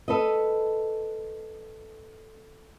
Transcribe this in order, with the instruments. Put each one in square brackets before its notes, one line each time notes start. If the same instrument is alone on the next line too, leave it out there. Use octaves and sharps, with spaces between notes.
[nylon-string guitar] A4 B4 D#5